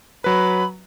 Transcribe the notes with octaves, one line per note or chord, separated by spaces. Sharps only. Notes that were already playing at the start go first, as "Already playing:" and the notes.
F#3 B4 B5